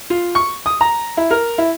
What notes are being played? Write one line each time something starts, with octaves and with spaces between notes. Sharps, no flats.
F4
C#6
D#6
A#5
E4
A#4
E4